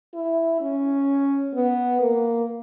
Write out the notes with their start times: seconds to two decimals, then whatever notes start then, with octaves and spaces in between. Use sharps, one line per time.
0.14 E4
0.61 C#4
1.54 B3
2.01 A#3